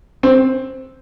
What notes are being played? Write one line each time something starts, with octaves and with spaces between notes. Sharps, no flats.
C4